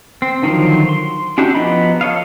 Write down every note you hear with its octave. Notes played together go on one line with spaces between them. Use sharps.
C4
D3 D#3 F3 F#3 C5
C6
C#4 D4 E4 F#4 G4
F3 B3 D#5 A#5 B5
A4 C#5 D#5 F5